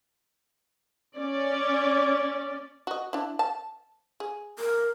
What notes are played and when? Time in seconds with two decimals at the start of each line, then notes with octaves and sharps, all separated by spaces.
1.16 C#4 D5
2.87 F#4 D#5
3.13 D4 E4
3.39 A5
4.20 G#4
4.59 A#4